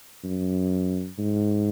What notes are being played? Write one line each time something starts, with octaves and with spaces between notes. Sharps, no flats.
F#2
G#2